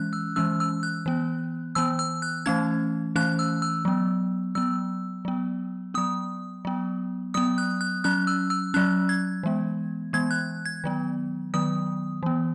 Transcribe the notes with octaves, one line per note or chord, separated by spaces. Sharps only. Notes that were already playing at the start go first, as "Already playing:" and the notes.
Already playing: E3 G#3 C#4 F#6
E6
E3 G#3 C#4 E6
E6
F#6
E3 B3
E3 B3 E6
E6
F#6
E3 A3 C#4 G#6
E3 A3 C#4 F#6
E6
E6
F#3 B3
F#3 B3 E6
F#3 B3
F#3 B3 D#6
F#3 B3
F#3 B3 D#6
F#6
F#6
F#3 C#4 F#6
E6
E6
F#3 C#4 F#6
G#6
E3 G#3 B3
E3 G#3 B3 G#6
F#6
G#6
D#3 F#3 B3
D#3 F#3 B3 D#6
E3 B3